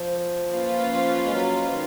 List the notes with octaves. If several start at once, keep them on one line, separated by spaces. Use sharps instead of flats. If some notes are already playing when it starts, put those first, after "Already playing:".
Already playing: F3
A#3 C#4 F4 B4
F3
G#3
F#3
F3
D#3